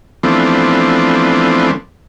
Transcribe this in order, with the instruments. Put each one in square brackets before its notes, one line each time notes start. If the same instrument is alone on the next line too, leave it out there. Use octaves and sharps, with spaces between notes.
[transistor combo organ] E3 F3 A3 B3 C4 D4